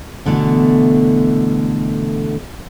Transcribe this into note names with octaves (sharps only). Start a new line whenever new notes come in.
B2 D3 E3 A3